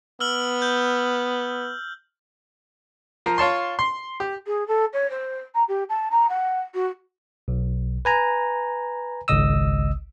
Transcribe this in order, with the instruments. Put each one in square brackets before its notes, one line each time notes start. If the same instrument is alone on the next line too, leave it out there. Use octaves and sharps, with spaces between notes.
[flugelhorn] B3 [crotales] E6 F6 F#7
[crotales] G6
[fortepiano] F3 A#4
F4 C#5 A5 C6
C6
G4
[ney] G#4
A4
C#5
C5
A#5
G4
A5
A#5
F#5
F#4
[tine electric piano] B1
B4 G#5 A#5
G#1 C#2 D#5 D#6 E6